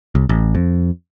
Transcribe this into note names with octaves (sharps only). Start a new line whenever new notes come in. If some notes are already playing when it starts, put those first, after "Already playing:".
C2
A1
F2